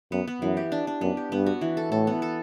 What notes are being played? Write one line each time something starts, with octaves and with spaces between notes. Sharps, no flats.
F#2 B3
B3
F#2 E3
G4
D4
D4
F#2 B3
G4
G2 B3
F#4
E3
A4
A2 A4
B3
A4